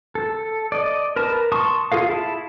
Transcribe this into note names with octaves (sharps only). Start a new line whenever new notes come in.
A4
D5 D#5
A#4 B4 A5
A5 C6 C#6 D#6
F4 G#4 A4 F5
E4 A5